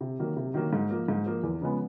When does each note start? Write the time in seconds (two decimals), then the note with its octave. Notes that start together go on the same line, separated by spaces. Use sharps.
0.01 C3
0.19 D#3 F#3 A#3
0.36 C3
0.54 D#3 F#3 A#3
0.73 G#2
0.90 F3 A#3
1.08 G#2
1.26 F3 A#3
1.43 E2
1.61 C#3 F3 G#3 B3